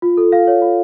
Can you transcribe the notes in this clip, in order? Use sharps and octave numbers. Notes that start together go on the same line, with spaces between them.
F4
A4
F5
C#5
F4